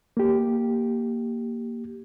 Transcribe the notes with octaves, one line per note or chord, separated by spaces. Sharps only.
A#3 G4